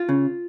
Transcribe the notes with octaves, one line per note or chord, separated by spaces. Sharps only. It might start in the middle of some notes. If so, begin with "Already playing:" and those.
Already playing: F4
C#3